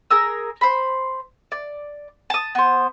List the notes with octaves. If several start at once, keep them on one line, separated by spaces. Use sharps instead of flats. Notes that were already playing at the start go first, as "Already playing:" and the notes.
G#4 A#4 E6
C5 B5
D5
A5 D#6
B3 C5